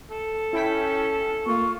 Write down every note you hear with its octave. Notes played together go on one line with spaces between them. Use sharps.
A4
C#4 E4 G5 B6
A3 A#3 F4 C#6